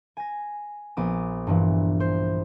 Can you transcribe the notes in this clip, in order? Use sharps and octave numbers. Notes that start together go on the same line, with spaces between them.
G#5 A#6
A#1 B3 D6 D#6
G2 A#2 E3
C5